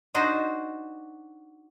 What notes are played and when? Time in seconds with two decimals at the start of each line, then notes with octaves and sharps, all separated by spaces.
0.14 D4 D#4 F#4 C5